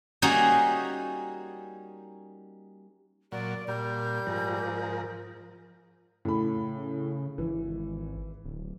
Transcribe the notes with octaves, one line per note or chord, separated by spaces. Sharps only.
G3 A#3 C#4 D#4 F#4 G#4
A#2 F#3 D5
A#2 G3 G6
G#2 F3 A#4
A2 C#3 B5
G#1 E3
D1